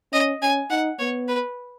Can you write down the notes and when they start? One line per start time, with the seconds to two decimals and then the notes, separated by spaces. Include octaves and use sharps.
0.13 C#4 D#5
0.41 C#4 G#5
0.70 D#4 F#5
0.99 B3 C#5
1.28 B4